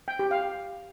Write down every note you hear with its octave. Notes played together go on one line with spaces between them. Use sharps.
G5
G4
F5